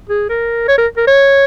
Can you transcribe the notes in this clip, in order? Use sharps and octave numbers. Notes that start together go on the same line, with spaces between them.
G#4
A#4
C#5
A#4
A#4
C#5